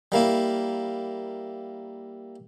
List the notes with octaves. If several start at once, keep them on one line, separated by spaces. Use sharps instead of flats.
G3 A#3 E4